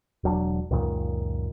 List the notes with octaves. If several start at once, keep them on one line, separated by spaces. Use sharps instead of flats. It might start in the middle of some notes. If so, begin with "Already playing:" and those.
E1 F#3 D4
C#2 F#2 A#2 D#3